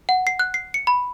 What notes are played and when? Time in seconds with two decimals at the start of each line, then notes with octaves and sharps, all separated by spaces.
0.09 F#5
0.27 C7
0.39 F#6
0.54 C7
0.74 C#7
0.87 B5